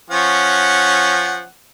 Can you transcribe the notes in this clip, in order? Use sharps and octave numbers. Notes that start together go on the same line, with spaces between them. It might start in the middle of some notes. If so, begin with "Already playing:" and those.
F3 C#4 F#5